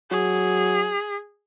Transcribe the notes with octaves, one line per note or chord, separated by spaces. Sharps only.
F#3 G#4